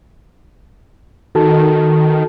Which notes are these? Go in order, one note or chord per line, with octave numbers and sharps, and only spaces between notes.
D#3 F#4 A4 A5